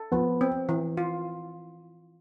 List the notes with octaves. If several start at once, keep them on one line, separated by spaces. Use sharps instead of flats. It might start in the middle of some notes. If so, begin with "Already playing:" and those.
Already playing: A4
F3 B3
C4
E3
F4